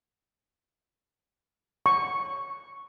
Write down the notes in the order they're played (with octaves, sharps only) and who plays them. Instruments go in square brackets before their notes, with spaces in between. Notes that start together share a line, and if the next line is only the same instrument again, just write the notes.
[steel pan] C#6